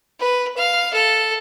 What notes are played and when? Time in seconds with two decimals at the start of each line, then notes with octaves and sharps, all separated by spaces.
0.19 B4
0.56 F5
0.93 A4